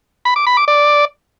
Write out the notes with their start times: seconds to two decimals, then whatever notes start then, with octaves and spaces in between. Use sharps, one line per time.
0.25 B5
0.36 D6
0.47 B5
0.57 D6
0.68 D5